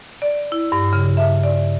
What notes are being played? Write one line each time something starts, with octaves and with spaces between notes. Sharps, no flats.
D5
E4
G2
C#3
E5
D5